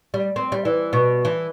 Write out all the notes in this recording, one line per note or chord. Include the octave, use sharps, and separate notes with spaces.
G3
C4
G3
E3
B2
E3